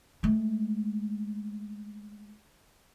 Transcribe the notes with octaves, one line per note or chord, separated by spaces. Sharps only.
G#3 A3